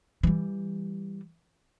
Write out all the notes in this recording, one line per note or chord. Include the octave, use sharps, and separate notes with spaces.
E3 G3